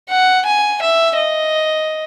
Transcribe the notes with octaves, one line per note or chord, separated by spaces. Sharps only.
F#5
G#5
E5
D#5